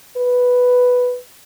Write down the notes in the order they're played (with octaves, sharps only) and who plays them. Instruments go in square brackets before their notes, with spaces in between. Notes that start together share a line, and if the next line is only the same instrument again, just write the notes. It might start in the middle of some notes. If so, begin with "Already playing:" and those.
[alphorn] B4